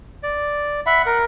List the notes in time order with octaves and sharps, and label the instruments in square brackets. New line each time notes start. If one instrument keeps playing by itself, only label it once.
[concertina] D5
[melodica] E5 B5 [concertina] F#5
[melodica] A#4